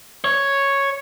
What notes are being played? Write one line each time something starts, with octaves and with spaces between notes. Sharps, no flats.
C#5